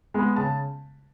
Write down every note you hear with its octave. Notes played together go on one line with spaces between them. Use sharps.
G#3 B3
C#3 A5